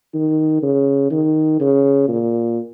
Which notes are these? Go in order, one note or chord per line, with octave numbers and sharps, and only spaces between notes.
D#3
C#3
D#3
C#3
A#2